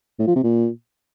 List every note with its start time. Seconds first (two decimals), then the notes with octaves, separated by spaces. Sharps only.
0.19 A2
0.27 F3
0.36 C3
0.44 A#2